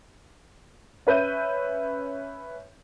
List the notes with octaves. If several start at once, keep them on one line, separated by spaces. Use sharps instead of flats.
C#4 B4 E5 G6 D#7